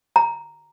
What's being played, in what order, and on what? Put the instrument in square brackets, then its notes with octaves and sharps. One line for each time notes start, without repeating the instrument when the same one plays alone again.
[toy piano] A#5